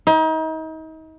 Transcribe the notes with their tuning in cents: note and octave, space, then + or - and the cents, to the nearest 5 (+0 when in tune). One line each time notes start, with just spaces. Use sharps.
D#4 +35